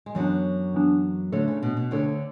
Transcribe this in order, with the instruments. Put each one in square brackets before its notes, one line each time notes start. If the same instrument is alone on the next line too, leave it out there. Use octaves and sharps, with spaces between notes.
[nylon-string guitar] G#3
[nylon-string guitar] F#2 F#3 [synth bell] E3 B3 D4
[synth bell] E3 B3 D4
[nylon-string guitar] D2 D3 [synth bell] A3 D4 A4 C#5
[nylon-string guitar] C#3
B2
B2
[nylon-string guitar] D2 D3 [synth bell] A3 D4 A4 C#5